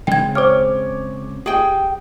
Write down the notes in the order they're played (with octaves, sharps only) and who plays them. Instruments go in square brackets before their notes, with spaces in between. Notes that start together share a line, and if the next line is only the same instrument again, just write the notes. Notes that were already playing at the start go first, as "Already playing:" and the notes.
[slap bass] C#3 G#3 C4 [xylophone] G5 G#6
[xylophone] C5 F6 [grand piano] C#5 D6
[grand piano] G4 [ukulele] G#4 G5